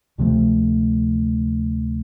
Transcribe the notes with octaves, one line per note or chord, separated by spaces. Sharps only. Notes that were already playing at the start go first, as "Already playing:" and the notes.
D2 C3 F3 A3